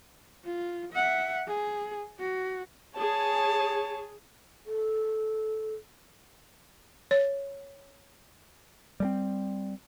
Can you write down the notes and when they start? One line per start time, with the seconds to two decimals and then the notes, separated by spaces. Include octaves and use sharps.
0.45 F4
0.92 E5 F#5
1.47 G#4
2.19 F#4
2.98 G#4 C#5 A5
4.66 A4
7.11 C#5
9.00 G3 G#3 C4